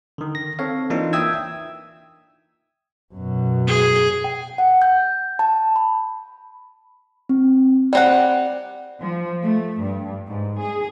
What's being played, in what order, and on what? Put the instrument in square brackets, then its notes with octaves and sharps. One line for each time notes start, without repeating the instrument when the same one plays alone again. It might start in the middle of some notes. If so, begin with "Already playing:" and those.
[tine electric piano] D3 D#3
A#6
C4 A4 C#5 F5
E3 A#3 D4 D#4 F4
E5 G5 D#6 E6 G#6
[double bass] F#2 B2
[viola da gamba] G#4
[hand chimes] G5
F#5
G6
A5
B5
C4
[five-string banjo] G3 C4 F#5 [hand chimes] D5
[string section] F3
A3
G2
G#2
G#4